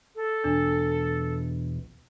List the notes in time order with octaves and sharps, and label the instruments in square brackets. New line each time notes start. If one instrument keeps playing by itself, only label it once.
[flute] A4
[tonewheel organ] E2 B2 [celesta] D4